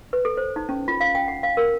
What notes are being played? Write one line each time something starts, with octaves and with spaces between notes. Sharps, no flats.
B4
A4
C5
D#4
C#4
F4
F5
G5
F#5
F5
A#4